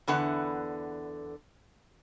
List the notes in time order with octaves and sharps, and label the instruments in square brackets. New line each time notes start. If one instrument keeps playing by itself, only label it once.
[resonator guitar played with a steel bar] E2 D3 B3 F#5